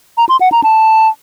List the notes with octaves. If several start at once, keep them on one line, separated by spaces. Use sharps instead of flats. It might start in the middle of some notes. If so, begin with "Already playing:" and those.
A#5
C6
F#5
A#5
A5